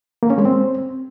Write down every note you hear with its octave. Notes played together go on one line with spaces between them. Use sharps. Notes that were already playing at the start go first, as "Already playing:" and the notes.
A#3
C#4
G#3
C4